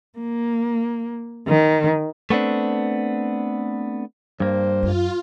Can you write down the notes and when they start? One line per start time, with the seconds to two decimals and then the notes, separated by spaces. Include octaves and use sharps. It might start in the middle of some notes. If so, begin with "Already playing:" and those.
0.19 A#3
1.48 D#3
2.30 A3 B3 C4 D4
4.40 G2 A#3 C5
4.83 F#2 F4